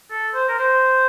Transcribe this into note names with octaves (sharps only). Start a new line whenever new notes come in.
A4
C5
A#4
C5